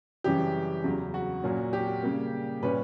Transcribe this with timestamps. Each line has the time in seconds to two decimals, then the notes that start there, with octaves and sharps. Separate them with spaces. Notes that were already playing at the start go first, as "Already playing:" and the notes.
0.24 F#2 C#3 E3 G3 C#4 G4
0.84 E2 C#3 F#3
1.14 F#4
1.44 A#2 F#3 A#3 C#4
1.73 G4
2.03 C#3 G3 A#3
2.62 A#2 G3 C#4 B4